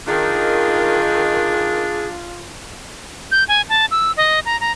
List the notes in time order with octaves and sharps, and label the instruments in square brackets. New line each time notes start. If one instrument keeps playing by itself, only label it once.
[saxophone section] D#3 [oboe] D4 [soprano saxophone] F4 [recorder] G#4
[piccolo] G6
G#5
A5
E6
D#5
A#5
A#5